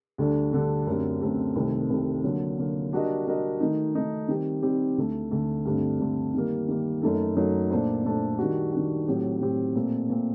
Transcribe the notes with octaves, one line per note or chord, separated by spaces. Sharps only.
D2 D3 G3 D4 A4
D2 D3 G3 D4 A4
F#2 D3 A3 C4 G4
F#2 D3 A3 C4 G4
C2 C3 D#3 A3 C4
C2 C3 D#3 A3 C4
D3 F#3 A#3
D3 F#3 A#3
G3 D4 F#4 A#4 D#5
G3 D4 F#4 A#4 D#5
D#3 A3 D#4
D#3 A3 D#4
D#3 G3 C4 G4
D#3 G3 C4 G4
D2 D3 A3
D2 D3 A3
G2 D3 A3 C4
G2 D3 A3 C4
D#3 G3 A#3
D#3 G3 A#3
F#2 F#3 A3 D#4 A4
F#2 F#3 A3 D#4 A4
A#2 A3 D4 A4 C5
A#2 A3 D4 A4 C5
D#3 G3 D4 F#4
D#3 G3 D4 F#4
A2 F#3 C4 G4
A2 F#3 C4 G4
A#2 A3 C4
A#2 A3 C4